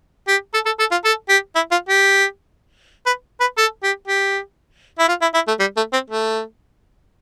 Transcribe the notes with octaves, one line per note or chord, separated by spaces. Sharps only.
G4
A4
A4
A4
F4
A4
G4
E4
F4
G4
B4
B4
A4
G4
G4
E4
F4
E4
E4
A3
G3
A3
C4
A3